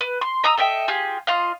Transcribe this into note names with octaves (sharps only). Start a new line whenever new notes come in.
B4
C6
D#5 A#5 D#6 E6
A4 D#5 E5 G5
F4 G4 G#4
F4 D#5 F5